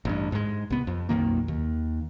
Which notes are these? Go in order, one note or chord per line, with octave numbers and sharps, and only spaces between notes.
A1 G2
G#2 G#3
C2 B3
F2
B1 F2 D#3 A#3
D#2